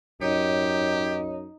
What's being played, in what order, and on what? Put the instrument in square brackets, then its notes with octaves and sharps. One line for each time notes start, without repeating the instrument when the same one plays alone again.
[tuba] F#2 [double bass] D#4 [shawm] G4 [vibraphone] C#5 D#5